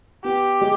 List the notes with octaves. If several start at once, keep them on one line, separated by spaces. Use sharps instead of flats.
B3 G4
G#3